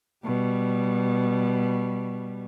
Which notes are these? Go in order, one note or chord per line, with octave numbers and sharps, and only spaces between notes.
B2 G3